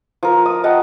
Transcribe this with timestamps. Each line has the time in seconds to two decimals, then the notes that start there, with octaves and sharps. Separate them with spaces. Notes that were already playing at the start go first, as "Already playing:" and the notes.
0.23 F3 A#4
0.46 D#6
0.64 D#5 F#5 G5 A5